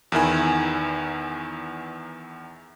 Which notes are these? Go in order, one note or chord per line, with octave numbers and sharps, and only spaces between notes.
E2 D#3 E4 G#5